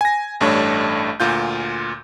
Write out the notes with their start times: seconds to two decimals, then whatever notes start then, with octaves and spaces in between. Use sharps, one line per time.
0.01 G#5 A#6
0.41 A1 G2 A3 D4 C#5
1.20 D2 A#2 F4 G6